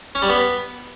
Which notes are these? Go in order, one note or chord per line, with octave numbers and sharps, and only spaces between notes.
C#4
G3
B3